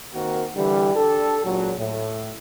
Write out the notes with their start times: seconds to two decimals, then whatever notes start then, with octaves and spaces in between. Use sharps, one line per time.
0.14 D#3 A#3 C4 F#4 A#4
0.56 D3 E3 G3
0.95 D4 G4 A4
1.44 C#2 A#2 C#3 F#3
1.78 A2